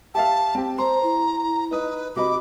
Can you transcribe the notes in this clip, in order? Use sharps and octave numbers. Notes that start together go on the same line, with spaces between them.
G4 E5 F5 A5
C4 G4
C5 A#5 C6
E4
D#4 B4 D#6
C3 F#4 D#5 B5 D6